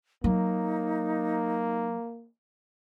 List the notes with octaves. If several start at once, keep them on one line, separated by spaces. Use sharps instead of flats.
F#3 A#3 D#4